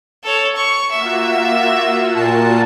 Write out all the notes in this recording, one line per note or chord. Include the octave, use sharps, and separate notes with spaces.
A4 C#5
C#6
A#3 F4 F#4 E5
A#2 A5